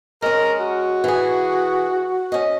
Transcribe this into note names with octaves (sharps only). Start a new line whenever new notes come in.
G#3 C#4 A#4
F#4
E3 G#4
C#4 D#5